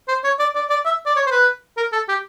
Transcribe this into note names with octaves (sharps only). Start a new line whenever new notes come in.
C5
C#5
D5
D5
D5
E5
D5
C#5
C5
B4
A#4
A4
G4